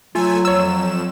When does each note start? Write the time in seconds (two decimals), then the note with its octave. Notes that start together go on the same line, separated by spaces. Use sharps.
0.15 F#3 A3 F4 G#5 E6
0.45 F2 C#5 E6 E7